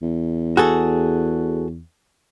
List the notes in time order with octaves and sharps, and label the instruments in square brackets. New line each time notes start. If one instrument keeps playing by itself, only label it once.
[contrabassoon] E2
[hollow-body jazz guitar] F#4 G#4 A4